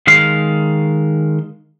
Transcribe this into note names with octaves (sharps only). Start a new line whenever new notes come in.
D#3 G#3 F5 C6